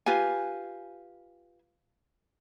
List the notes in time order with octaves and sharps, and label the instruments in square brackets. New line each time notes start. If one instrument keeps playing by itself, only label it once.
[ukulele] F4 G4 B4 G#5